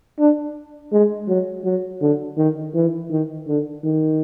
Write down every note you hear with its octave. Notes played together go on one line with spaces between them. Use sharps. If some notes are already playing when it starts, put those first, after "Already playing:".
D4
G#3
F#3
F#3
D3
D#3
E3
D#3
D3
D#3